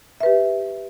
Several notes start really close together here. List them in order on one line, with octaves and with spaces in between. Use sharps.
E5 B4 G4